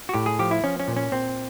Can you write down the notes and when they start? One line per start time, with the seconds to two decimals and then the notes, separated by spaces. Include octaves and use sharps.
0.09 F#4
0.14 A2 G4
0.26 G#4
0.39 F3 G4
0.51 E4
0.64 F3 C#4
0.80 C#4
0.88 A#2
0.96 C#4
1.12 A#2 C4